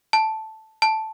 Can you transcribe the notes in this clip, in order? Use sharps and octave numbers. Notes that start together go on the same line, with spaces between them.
A5
A5